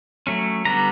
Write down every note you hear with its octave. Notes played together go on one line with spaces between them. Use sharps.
F#3 A3 C#4
D3 G3 B3 A#5